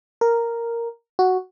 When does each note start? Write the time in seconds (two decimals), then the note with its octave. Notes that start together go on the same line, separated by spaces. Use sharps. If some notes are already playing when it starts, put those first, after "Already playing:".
0.21 A#4
1.19 F#4